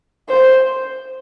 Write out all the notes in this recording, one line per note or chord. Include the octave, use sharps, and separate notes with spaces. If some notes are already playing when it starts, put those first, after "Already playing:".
C5